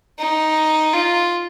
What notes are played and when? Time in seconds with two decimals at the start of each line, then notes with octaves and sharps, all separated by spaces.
0.19 D#4
0.94 F4